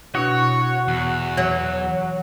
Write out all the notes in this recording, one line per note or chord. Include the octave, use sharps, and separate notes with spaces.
B2 D4 E4 F#4 C#5
E2
E3 F#3